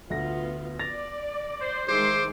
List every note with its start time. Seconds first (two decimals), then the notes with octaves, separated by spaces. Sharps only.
0.10 D2 B3 F4 A#6
0.79 D5 A6 A#6 F7
1.59 C5
1.88 D#3 G#3 G#4 C5 E5 C6 D6